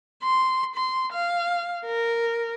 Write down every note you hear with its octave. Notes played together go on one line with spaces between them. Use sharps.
C6
C6
F5
A#4